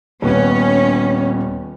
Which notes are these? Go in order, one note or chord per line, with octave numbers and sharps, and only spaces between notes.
D#1 B3 C#4